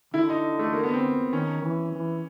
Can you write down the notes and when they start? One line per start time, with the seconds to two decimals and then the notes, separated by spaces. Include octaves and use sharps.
0.14 D3 E4
0.29 D#4
0.59 A3
0.73 A#3
0.83 B3
0.93 C4
1.32 D#3 C#4
1.62 E3
1.93 E3